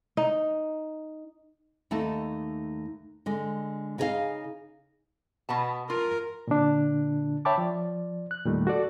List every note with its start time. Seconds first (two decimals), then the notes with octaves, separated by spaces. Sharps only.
0.17 D#4
1.91 D#2 A3 D#4 A5
3.26 D3 G#3
3.98 C#3 D#4 G#4 A#4 D#5 F5
5.49 B2 B3 A5
5.90 F4 A#4
6.47 A#2 D3 D4
7.45 C#5 E5 G5 A5 B5 D6
7.58 F3 D5
8.31 F#6
8.45 E2 A#2 D#3 G3 A3 D#4
8.67 F#4 A4 D5